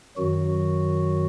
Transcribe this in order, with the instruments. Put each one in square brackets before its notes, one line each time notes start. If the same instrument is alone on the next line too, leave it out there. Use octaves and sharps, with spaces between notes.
[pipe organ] F#2 D#3 F#3 F#4